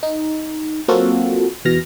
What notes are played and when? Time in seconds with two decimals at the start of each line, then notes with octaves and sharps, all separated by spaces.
0.03 D#4
0.88 F#3 A#3 C4 F4 F#4 A4
1.65 E2 B2 F6 A#6